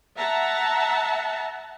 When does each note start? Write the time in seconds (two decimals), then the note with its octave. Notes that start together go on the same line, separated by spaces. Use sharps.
0.18 E5 F#5 A5 A#5